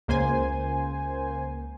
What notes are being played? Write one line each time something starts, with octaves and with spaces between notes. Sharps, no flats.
C#2 A#3 C5 G#5